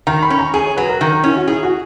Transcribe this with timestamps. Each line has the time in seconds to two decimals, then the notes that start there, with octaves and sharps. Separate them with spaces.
0.07 D#3 A#5
0.22 B5
0.30 C#4
0.39 A#5
0.54 G#4 G#5
0.66 C#5
0.77 F#3 B4
0.89 A#4
1.01 D#3
1.12 A#4
1.24 C#4 E4
1.36 F#4
1.48 E4 G#4
1.63 F#4